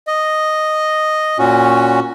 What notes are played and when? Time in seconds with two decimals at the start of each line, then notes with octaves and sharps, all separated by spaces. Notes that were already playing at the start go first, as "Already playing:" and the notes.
0.07 D#5
1.39 A#2 C#4 F#4